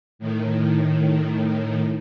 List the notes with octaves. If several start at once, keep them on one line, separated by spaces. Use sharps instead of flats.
A2 D#3